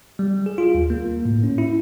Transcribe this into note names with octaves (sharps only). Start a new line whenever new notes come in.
G3
G#4
F4
D#2
A#3
A2
C#4
E4